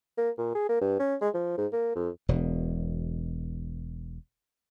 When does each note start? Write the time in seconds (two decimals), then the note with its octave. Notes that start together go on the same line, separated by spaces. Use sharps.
0.18 A#3
0.38 A#2
0.55 G#4
0.69 A#3
0.81 G2
0.99 C#4
1.21 G#3
1.34 F3
1.57 G#2
1.72 A#3
1.95 F2
2.28 E1 B2